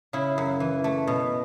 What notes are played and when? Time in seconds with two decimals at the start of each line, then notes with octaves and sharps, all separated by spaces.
0.13 C#3 E4
0.38 F#2
0.60 E3
0.84 A3
1.07 B2